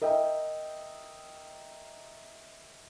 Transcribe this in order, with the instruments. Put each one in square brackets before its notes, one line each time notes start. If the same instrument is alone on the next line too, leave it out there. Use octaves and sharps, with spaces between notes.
[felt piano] A#4 D#5 E5 G5